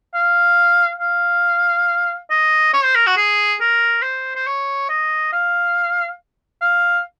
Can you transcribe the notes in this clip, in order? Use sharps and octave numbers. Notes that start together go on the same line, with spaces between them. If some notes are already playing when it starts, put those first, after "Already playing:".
F5
F5
D#5
C#5
C5
A#4
F#4
G#4
A#4
C5
C5
C#5
D#5
F5
F5